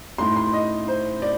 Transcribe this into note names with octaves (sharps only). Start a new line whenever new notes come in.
A2 A3 D#4 C6
C6
D#5
C5
D5